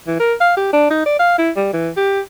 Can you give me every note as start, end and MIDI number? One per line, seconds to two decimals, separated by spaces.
0.07 0.16 52
0.20 0.34 70
0.41 0.55 77
0.57 0.71 67
0.73 0.87 62
0.91 1.03 63
1.06 1.19 74
1.19 1.38 77
1.38 1.51 64
1.56 1.69 55
1.73 1.90 52
1.97 2.21 67